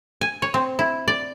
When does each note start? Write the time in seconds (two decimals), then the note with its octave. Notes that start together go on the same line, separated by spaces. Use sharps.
0.21 G#5
0.42 C#5
0.54 C4
0.79 E4
1.08 D5